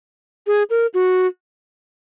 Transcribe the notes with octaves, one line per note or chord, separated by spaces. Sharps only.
G#4
A#4
F#4